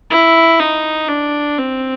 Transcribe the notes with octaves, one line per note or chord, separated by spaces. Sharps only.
E4
D#4
D4
C4